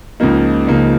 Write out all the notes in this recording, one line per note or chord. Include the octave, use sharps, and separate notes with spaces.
C#2 C#3 F3 A#3 D#4
C#2 C#3 F3 A#3 D#4